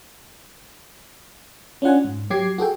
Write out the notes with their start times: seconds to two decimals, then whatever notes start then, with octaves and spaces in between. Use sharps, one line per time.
1.82 C#4 D4 F4 F#5 G#5
2.04 G#2
2.30 F#3 G4 D6 G#6 C7
2.58 F#4 G#4 A4 G5